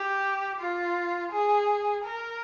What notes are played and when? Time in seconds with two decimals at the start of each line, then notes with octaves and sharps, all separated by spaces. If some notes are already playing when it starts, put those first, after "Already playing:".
Already playing: G4
0.60 F4
1.32 G#4
2.05 A#4